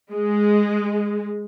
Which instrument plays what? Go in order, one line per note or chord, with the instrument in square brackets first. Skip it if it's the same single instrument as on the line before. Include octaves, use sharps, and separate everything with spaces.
[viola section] G#3